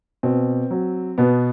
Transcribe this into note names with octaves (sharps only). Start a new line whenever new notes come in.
B2 C4
F#3
B2 B3